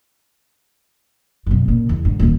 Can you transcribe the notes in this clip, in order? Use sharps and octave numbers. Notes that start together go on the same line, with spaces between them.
F#2 B2
A#2 C#3
E2
G#2 D3
D#1 D#2